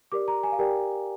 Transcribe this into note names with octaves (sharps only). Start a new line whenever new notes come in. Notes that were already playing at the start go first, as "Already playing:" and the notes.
G4 A#4 D5 D6
A#5
G#5
F5
G4 A#4 D5 G5